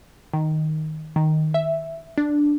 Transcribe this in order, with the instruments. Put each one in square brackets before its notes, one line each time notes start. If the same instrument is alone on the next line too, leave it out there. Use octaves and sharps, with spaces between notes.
[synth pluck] D#3
D#3
E5
D4